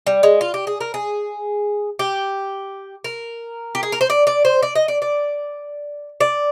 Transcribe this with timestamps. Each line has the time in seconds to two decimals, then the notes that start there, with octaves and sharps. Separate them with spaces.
0.07 G3
0.23 G#3
0.41 F4
0.54 G4
0.67 G#4
0.81 A#4
0.94 G#4
1.99 G4
3.04 A#4
3.75 G4
3.83 G#4
3.92 A#4
4.01 C5
4.10 D5
4.27 D5
4.45 C5
4.63 D5
4.75 D#5
4.88 D5
5.02 D5
6.21 D5